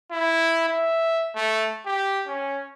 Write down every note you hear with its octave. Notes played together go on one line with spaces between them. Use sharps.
E4
E5
A3
G4
C#4